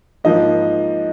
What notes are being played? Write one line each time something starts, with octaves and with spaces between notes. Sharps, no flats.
G#2 F3 A#3 D#5